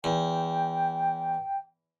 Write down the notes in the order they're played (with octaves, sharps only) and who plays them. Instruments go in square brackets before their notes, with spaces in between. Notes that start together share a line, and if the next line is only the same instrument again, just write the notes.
[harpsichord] E2 [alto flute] G5